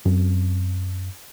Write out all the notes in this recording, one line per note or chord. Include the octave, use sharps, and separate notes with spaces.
F#2 C4